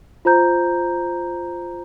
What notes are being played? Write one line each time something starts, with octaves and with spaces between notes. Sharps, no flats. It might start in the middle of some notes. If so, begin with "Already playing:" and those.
F4 C5 A#5 G6